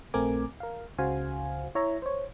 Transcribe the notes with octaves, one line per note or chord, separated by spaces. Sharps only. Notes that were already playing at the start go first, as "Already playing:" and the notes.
A#1 A3 C4 A#4 G#5 D6
A#4 F5
C#2 C#3 F#4 C5 F5 G#5
E4 C#5 E5 A#5
C5 C#5